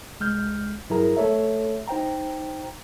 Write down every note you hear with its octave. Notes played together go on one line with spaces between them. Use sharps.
C2 G#3 F6 G6
G2 F#3 E4 G#4 A#4 A#5
A3 A4 C#5 E5
D#4 C5 G5 A#5